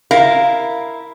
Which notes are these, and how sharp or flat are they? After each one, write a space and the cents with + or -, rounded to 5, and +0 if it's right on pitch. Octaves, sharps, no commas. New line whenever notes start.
E4 +0 A#4 +0 F5 +0